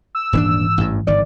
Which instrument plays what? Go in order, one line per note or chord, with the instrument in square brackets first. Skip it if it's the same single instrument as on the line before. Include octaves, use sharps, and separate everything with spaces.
[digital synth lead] E6
[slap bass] D#1 C4 D4 [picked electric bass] G#2 E3
[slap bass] A1 G2
[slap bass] G1 D#3 [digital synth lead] D5